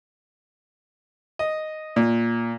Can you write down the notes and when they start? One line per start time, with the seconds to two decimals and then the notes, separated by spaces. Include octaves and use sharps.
1.39 D#5
1.96 A#2